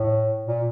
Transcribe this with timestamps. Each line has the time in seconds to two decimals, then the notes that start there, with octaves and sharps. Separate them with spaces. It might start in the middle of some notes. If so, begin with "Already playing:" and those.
Already playing: A2
0.47 A#2